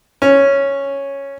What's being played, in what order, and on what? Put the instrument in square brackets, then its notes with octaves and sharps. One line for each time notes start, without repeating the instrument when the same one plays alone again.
[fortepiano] C#4